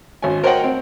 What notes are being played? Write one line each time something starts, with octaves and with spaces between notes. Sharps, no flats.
G#1 C#4 G#5
A#4 C5 C#5 D#5 F#5 G5
C4